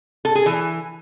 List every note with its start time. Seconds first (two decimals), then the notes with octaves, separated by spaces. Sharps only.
0.25 A4
0.35 G#4
0.46 E3